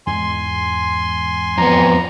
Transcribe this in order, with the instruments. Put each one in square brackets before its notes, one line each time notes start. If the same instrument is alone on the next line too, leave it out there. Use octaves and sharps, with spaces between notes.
[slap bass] E2 G#2 G#3 [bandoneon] G#5 C6
[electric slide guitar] F2 B3 [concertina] A#5